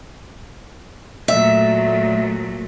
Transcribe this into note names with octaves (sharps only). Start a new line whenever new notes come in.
A#2 F#3 A3 E5